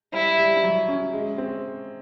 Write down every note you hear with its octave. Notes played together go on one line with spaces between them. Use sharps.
G3 E4
G3
F#3
C#4
G#3
C4